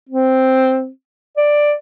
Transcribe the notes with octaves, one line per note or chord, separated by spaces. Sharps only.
C4
D5